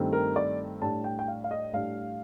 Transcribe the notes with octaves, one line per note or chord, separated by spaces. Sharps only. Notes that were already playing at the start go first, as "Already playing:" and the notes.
Already playing: G2 D#3 A3 C4
A#4
D5
A2 G3 D4 A5
G5
G5
F5
F5
D#5
A2 G3 D4 F5